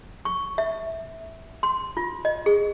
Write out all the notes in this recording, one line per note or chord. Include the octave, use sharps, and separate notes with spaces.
C#6
E5
C6
F4
D#5
G#4